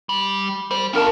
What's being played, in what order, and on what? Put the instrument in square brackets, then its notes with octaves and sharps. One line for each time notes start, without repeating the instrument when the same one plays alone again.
[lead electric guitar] G3
[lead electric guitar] G3 [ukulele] C5
[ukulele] D4 A#4 A5 [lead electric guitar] F4 G4